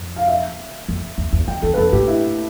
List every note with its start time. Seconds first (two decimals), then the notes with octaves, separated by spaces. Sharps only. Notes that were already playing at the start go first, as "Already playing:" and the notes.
Already playing: F2
0.16 F5
0.28 E5
0.88 F2
1.18 E2
1.33 E2
1.48 F2 G5
1.62 E2 A4
1.74 B4
1.78 F2 A4
1.92 A2 G4
2.07 E4